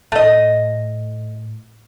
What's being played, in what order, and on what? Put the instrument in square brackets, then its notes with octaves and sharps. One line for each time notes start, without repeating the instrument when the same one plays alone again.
[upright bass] A2 [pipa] A3 D#5